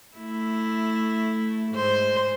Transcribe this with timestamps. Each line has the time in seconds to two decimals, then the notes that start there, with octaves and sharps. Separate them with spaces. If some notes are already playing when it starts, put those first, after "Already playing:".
0.16 A3 E4
1.72 G#2 C5